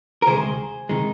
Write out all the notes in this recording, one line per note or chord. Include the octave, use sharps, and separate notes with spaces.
A#4
D2 C3 D#3 G#3 G#4 C5
C3 D#3 G#3